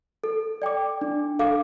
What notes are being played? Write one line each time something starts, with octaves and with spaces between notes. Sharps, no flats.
A4
D5 G5 D6
D4
A4 F5 D6